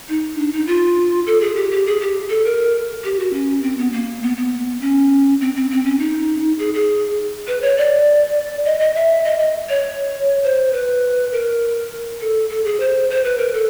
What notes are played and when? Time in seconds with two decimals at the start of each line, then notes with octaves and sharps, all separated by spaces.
0.09 D#4
0.38 D4
0.53 D#4
0.67 F4
1.27 A4
1.41 G#4
1.56 G4
1.71 G4
1.87 G#4
2.01 G4
2.30 A4
2.45 A#4
3.04 G4
3.19 F#4
3.33 C#4
3.63 C4
3.78 B3
3.93 A#3
4.23 B3
4.37 B3
4.81 C#4
5.41 C4
5.55 C4
5.70 C4
5.85 C#4
5.99 D#4
6.59 G#4
6.74 G#4
7.48 B4
7.62 C#5
7.78 D5
8.65 D#5
8.80 D#5
8.95 E5
9.25 D#5
9.39 D#5
9.69 C#5
10.44 C5
10.73 B4
11.32 A#4
12.21 A4
12.50 A4
12.65 G#4
12.80 C5
13.10 C5
13.24 B4
13.38 A#4
13.54 A4